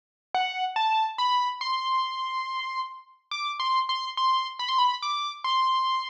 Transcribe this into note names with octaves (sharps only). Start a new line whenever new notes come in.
F#5
A5
B5
C6
D6
C6
C6
C6
B5
C6
B5
D6
C6